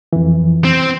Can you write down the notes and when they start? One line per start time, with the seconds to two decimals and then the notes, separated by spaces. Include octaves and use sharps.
0.13 F2 E3
0.64 C4